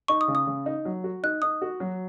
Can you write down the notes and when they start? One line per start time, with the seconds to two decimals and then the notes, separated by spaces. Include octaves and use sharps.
0.08 D#4 C#6
0.21 D#6
0.28 C#3
0.35 D#6
0.47 C#3
0.66 D#4
0.85 F#3
1.04 F#4
1.23 D#4 F#6
1.42 D#4 D#6
1.62 F#4
1.80 F#3